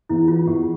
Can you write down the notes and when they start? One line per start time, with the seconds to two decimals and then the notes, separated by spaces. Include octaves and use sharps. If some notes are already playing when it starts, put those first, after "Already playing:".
0.09 E2 E4
0.28 E3 F4
0.47 E2 G4